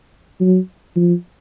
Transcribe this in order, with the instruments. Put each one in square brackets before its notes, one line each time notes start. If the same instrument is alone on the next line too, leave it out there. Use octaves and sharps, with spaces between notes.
[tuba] F#3
F3